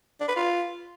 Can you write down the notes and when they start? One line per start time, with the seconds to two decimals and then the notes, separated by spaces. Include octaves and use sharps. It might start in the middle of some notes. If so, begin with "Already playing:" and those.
0.20 D4
0.28 B4
0.36 F4